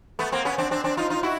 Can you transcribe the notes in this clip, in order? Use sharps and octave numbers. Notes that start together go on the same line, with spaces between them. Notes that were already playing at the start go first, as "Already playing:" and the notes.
A3 B3
A#3 C4
B3 C#4
C4 D4
C4 D4
C4 D4
D#4 F4
D#4 F4
E4 F#4